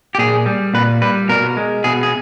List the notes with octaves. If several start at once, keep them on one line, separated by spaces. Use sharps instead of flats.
G4
A#2 G#4
G3
A#2 B4
G3 B4
B2 A#4
G#3
B2 G#4
G#4